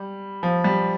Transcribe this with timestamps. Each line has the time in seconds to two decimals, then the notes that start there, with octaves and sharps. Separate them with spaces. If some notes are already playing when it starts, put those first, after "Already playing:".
Already playing: G3
0.43 F3
0.64 G3